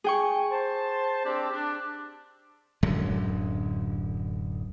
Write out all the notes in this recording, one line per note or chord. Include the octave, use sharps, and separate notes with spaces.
G#4 G5 C#6
C5 A5
C4 D4 G4
D4
D1 F#2 D3 G#3